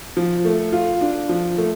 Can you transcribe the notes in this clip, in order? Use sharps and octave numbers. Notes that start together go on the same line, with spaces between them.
F3
A3
F4
D4
F3
A3